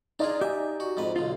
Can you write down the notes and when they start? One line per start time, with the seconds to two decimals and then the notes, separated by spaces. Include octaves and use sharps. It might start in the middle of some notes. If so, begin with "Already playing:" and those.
0.19 D4 D#4 F4 G#4 D5 D#5
0.41 G4 E5 G#5
0.80 F#4
0.97 F2 G#2 B4
1.16 B1 D3 F4